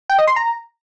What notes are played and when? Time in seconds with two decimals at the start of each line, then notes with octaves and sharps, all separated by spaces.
0.10 G5
0.18 D#5
0.27 C6
0.36 A#5